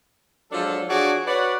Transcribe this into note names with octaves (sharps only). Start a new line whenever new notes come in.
F3 F#3 G#3 D4 A4
F3 D4 F#4 G#4 C#5 D5
F#4 B4 C#5 D5 F#5